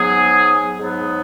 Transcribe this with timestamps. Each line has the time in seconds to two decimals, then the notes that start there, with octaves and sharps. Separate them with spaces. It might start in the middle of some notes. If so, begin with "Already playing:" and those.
Already playing: G#2 F#3 B3 G#4
0.80 G#2 F#3 B3